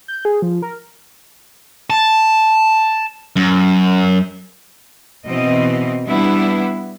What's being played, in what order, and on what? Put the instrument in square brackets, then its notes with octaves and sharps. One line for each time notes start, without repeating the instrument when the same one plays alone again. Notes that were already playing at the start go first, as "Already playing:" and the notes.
[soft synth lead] G6
G#4
F3
A#4
[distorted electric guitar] A5
F#2
[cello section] B2 E3 C4 D#5
G3 B3 D4 E4